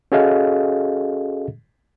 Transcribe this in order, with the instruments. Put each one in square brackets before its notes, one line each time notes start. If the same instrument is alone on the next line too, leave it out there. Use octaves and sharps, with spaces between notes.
[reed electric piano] C#4 F#4 G#4 A4 D#5 F5